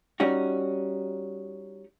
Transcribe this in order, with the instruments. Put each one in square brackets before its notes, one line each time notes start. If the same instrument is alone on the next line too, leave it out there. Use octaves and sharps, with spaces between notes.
[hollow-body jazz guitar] G3 C#4 D#4 F#4